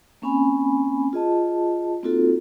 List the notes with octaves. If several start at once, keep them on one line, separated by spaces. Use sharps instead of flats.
A#3 C4 C#4 G#5 B5
F4 G#4 D#5 A5
A#3 C4 D#4 F4 F#4 A4